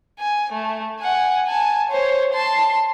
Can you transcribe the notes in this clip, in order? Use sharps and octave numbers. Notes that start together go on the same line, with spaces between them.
G#5
A3
F#5 G#5
G#5 A5
C5 C#5
A5 C6